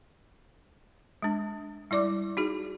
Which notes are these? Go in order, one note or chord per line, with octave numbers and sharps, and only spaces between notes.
G#3 D4
G3 E4 D5 D6
D#4 F#4 G#4